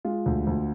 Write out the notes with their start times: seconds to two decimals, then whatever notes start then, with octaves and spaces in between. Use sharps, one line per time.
0.05 G#3 F4
0.26 D2
0.47 D2